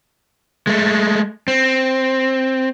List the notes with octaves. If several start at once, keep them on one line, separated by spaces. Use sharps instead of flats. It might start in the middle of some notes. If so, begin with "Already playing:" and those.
G#3 A3
C4